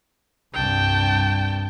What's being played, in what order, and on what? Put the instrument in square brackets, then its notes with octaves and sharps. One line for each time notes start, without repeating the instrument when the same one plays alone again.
[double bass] C2 G2 [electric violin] G5 A5